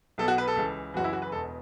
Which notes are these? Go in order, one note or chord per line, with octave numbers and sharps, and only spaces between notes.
B1 B2 A4
F#4
B4
A4
C#2 C#3 E3
F#1 F#2 C#3 E3 F#4
E4
F#4
B4
E1 E2 B2 A4